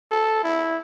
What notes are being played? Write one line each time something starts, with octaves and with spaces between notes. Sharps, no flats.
A4
E4